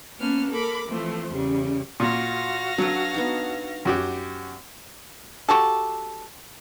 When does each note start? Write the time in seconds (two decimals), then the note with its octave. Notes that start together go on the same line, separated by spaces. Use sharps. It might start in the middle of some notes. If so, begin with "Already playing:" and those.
0.18 A#3 B3 C#4 A5 F6
0.50 A4 A#4 B5 D6
0.86 E3 F3 A3 C4
1.32 E2 C#3 G3
2.00 A#2 F#4 F5 A#6
2.78 F#3 D4 A4 B4
3.14 B3 D4 D#4
3.85 F#2 F#4 G4
5.49 F#4 G4 A4